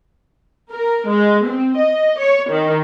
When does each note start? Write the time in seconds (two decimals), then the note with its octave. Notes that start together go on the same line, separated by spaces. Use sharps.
0.72 A#4
1.08 G#3
1.47 C4
1.77 D#5
2.20 C#5
2.51 D#3